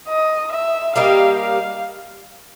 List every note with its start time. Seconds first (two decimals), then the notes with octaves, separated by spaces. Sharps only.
0.08 D#5
0.52 E5
0.95 G3 A#3 D#4 G4 F5
1.40 F5